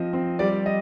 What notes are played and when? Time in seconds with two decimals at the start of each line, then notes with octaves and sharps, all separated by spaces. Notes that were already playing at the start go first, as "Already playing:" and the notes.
Already playing: F3 C4 D#5
0.13 C4
0.39 G3 D5
0.66 D#5